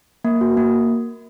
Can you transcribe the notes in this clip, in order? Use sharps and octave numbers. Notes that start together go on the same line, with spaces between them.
A#3
F#4
A#3